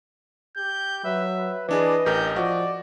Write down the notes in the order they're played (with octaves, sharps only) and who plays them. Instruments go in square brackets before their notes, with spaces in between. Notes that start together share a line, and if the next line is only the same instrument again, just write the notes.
[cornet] G4 [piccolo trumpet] G6
[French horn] F#3 [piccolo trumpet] B4 [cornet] E5
[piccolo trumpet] B4
[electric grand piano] E3 D4 G#4 [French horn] B4 [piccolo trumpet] D5 [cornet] D#5
[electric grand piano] A1 G4 A#4 [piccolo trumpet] G6
[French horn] F3 [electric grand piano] F#4 [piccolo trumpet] D5